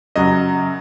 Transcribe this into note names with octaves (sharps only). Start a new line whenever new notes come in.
F#2 C#3 F#3 D#5